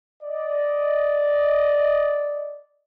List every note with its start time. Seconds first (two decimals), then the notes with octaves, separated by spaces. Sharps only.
0.23 D5 D#5